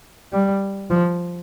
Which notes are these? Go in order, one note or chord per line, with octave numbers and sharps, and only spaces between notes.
G3
F3